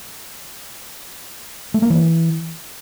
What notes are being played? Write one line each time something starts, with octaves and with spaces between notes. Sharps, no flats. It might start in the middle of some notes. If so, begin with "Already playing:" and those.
A3
A#3
E3